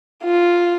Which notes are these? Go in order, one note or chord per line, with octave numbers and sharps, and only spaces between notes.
F4